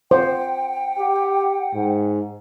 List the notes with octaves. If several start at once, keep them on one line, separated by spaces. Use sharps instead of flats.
C5 F#5 G5
G4
G#2